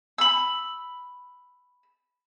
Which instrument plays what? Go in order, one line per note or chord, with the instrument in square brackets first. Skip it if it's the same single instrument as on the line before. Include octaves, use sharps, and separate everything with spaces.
[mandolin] B5 E6